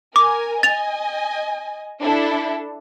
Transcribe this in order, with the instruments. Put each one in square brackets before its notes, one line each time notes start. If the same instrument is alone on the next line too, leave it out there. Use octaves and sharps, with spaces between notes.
[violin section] A#4 G#5 [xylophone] D6
[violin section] D#5 G#5 [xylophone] A6 F7
[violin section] D4 E4 A4